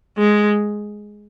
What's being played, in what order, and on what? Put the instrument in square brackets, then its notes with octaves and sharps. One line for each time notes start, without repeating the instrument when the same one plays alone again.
[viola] G#3